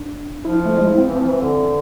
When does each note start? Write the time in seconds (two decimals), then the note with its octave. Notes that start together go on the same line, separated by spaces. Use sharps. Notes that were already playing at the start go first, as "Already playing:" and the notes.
Already playing: D4
0.44 F3 E4
0.65 A3
0.77 G#3
0.87 E4
0.98 C4
1.09 E3
1.19 F3
1.29 E3
1.40 D3